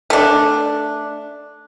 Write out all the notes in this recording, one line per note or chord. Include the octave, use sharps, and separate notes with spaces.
A3 D4